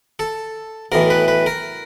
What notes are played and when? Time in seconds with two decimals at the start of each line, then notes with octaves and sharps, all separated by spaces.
0.19 A4
0.92 B1 A2 E3 A#4
1.10 B4
1.28 B4
1.46 A#4